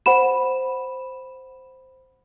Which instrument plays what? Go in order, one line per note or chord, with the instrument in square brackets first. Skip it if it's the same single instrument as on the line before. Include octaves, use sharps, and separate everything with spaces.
[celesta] C5 F#5 B5 E7